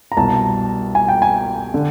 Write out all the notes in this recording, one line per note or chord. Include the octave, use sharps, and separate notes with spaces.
A#5
C2 B2 A5
G#5
G5
G#5
D3